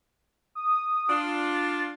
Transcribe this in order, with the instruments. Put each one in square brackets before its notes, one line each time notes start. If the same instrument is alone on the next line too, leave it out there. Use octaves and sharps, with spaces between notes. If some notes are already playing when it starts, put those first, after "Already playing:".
[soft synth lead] D#6
[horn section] D4 F4
[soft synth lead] A6